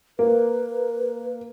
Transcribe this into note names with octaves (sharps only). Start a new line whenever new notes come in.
A#3 B4